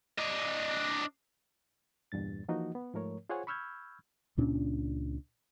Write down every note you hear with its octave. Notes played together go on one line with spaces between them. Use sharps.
D4 D#5
E2 G2 A#2 A6
E3 F3 A#3 D#4 F#4 D#5
B3
G#2 F3 A3 A#4 C#5
F4 G#4 C5 C#5 F#5 G#5
B5 C#6 E6 F6 G6 G#6
C#2 A#2 C#4 D4